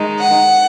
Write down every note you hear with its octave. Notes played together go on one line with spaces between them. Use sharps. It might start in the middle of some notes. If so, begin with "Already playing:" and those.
Already playing: D#3 G#3 D#4
F#5